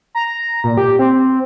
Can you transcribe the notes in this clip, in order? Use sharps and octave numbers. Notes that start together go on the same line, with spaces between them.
A#5
A#2
G4
C4